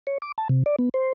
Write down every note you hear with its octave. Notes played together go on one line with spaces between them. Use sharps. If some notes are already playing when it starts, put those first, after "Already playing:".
C#5
D6
A5
C3
D5
B3
C5